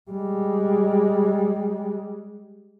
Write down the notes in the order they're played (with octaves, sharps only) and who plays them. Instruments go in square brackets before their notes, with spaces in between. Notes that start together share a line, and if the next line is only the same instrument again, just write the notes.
[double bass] G3 G#3